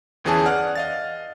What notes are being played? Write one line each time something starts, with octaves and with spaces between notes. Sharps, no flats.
G1 E2 E3 C#4 G#4 A5
D5 F#5 F6
D#5 F5 A6